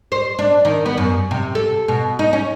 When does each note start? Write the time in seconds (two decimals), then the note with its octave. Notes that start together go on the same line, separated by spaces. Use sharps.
0.12 C5
0.39 D4
0.65 D#3
0.86 B3
0.97 F#2
1.31 C3
1.55 A4
1.88 B2
2.19 D#4
2.33 C#4